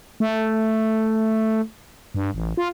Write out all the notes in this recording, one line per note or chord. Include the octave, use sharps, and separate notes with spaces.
A3
G2
A1
F4